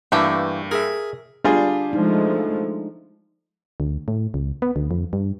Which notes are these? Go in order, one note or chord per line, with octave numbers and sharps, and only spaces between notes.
G2 E3 A3 A#3 G4
G#4 A#4 E5
G3 D4 F4 G#4
F3 G#3 A3 D#4
D2
A2
C#2
B3
D2
F2
G2